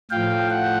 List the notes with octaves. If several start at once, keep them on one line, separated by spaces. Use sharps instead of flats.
A2 F3 F5 G5
F#5